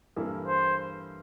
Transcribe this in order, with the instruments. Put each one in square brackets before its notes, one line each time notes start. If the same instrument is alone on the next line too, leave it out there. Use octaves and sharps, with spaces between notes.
[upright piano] G2 E3 A#3 E4 A4
[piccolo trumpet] C5